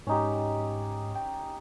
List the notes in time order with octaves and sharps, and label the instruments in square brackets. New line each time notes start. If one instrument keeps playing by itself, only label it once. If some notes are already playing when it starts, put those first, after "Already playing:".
[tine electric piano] G#2 [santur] C#4 D#4 G4
[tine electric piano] G5